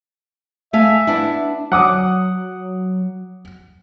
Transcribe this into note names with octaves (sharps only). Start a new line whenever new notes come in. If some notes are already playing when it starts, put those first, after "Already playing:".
A3 E5 F5 G#5
B3 D4 E4
F#3 F#5 D6 D#6